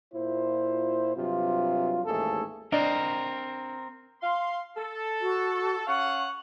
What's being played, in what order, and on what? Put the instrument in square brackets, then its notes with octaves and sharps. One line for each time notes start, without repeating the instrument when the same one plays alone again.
[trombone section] A#2 E4 F4 C5
G2 C3 F#3 F4
A1 D#2 G#2 A3 G#4 A4
[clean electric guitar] C4 A#4 [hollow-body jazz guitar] D4 D5 D#5
[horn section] F5 C6
A4
[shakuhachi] F#4
[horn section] C#4 F5 F#5 [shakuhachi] C#6